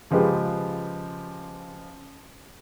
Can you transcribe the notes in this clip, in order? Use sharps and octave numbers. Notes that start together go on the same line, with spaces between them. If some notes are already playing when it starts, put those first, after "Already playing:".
C#3 F3 G#3 G4 B4